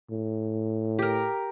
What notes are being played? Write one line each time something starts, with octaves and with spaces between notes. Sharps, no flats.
A2
G4 A#4